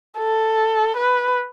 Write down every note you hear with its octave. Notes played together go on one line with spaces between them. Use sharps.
A4
B4